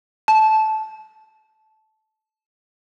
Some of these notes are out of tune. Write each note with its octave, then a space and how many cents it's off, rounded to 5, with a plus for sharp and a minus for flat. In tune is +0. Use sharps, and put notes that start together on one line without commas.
A5 -15